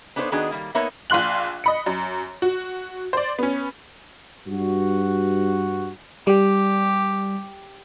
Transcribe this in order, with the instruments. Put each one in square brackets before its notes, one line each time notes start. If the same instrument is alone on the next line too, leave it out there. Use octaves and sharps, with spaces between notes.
[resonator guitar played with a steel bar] B3 D4 D#4 G4 C5 C#5
D#3 B3 D4 F#4 G#4 D#5
D#3 G3 A#3
A#3 B3 D#4 A#4 C#5 E5
[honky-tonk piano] A#1 F5 C6 F#6 F#7
D#5 B5 C#7
F#2
F#4
C5 D5
B3 C#4
[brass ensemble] G2 F#4
[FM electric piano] G3 [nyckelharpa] G4